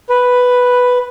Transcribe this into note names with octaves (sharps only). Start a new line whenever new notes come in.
B4